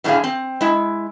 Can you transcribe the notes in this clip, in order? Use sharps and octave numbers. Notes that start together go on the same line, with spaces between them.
F#2 A2 D3 D4 G#4 F5
C4
G#3 E4